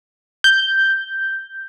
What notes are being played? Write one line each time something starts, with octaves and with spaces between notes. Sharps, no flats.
G6